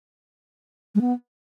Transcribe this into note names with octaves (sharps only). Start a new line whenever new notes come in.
G#3
B3